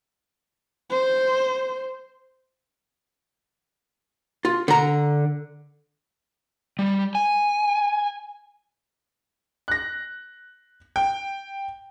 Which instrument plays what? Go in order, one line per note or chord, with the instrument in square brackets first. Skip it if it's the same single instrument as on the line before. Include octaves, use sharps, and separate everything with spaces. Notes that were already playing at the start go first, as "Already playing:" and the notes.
[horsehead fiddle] C5
[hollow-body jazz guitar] F4
D3 A#5
[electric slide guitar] G3
G#5
[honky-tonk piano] F#6 A#6
G5